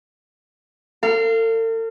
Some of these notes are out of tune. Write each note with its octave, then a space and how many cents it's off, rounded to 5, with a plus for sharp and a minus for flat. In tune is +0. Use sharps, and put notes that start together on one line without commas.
A4 +45 F5 -20